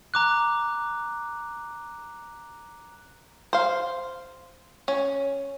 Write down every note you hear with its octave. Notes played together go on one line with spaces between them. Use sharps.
A#5 D6 F#6
C5 F5
C#4